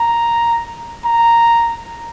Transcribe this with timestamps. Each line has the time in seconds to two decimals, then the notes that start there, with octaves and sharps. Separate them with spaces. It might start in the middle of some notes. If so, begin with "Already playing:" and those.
Already playing: A#5
1.05 A#5